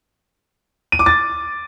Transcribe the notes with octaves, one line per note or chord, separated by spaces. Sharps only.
D#7
D6
A6